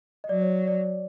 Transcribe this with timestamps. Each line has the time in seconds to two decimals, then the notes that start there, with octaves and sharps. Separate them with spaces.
0.24 D#5
0.29 F#3 D5
0.42 C#5
0.68 D5